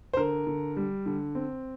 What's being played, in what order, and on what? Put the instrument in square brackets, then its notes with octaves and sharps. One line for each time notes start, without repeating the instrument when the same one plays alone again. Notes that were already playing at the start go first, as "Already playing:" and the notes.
[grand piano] C5
D3 A#4
D3
G3
D3
C4